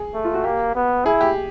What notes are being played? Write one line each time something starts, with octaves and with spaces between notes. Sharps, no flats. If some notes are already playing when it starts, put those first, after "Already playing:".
Already playing: G#4
A3
F4
F#4
A#3 G4
B3
E4 G#4
G4